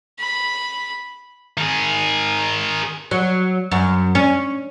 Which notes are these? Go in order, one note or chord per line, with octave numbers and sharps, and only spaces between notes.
B5
D#3 G#4
F#3
F#2
C#4